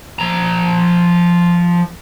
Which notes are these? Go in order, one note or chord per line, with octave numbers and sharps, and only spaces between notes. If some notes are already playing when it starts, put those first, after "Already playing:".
F3 A#5